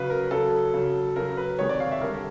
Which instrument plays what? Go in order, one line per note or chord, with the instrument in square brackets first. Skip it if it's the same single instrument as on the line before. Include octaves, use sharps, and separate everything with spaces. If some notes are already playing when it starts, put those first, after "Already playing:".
Already playing: [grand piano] C#3 F#3 B4
A#4
C#3 F#3 A4
C#3 F#3
C#3 F#3 A#4
B4
C3 D#3 G#3 C#5
D5
F5
E5
D3 G3 A#4